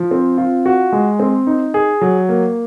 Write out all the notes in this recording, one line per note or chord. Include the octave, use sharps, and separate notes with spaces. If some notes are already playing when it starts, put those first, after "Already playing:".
Already playing: F3
C4
F4
F#4
G#3
C4
D#4
G#4
F#3
A#3